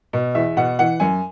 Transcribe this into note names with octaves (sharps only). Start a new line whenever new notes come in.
B2
E2 E5
B2 F#5
E3 F#5
F#2 G#5